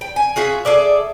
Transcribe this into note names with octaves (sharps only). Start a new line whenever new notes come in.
G5
G#5
F4 F#4 G#4 E5
G#4 A4 D5 E5